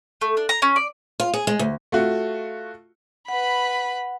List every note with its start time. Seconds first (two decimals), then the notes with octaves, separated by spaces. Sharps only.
0.21 A3
0.37 D4
0.49 A#5
0.62 C#4
0.76 D5
1.20 F4
1.34 G#4
1.47 G#3
1.59 D2
1.92 A3 F4 F#4
3.28 B4 F#5 B5